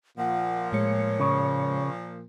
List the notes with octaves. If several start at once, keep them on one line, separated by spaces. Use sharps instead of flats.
A#2 F3 F#5
A2 G#3 C#5 C#7
C#3